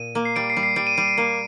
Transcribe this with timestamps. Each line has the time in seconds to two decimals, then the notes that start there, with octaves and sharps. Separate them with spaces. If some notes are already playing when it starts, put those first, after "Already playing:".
Already playing: A#2 D#7
0.15 A#3
0.25 C7
0.36 G3 D7
0.50 C7
0.57 G3
0.63 C7
0.76 G3 D7
0.87 D#7
0.98 G3 D7
1.08 D7
1.17 A#3